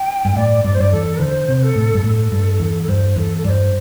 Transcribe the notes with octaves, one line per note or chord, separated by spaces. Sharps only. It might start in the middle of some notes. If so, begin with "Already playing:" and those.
Already playing: G5
G2
A2 D5
G2 D5
C5
G2 D5
E2 A4
D3 C5
C3
A4
A2
G2
A2 A4
G2
E2
A4
G2 C5
E2 A4
A4
G2 C5 D5